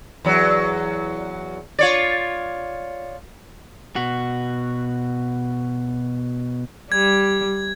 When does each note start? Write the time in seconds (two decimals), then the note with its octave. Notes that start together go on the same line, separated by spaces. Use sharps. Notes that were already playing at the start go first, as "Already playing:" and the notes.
0.25 E2 F#3
1.79 F4 C#5 D5
3.96 B2 F#4
6.92 G3 G#6